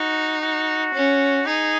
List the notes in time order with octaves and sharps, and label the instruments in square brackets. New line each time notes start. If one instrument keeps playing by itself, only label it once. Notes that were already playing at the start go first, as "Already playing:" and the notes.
Already playing: [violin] D#4 [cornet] F#4
[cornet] F#4
[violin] C#4
[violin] D#4 [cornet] G#4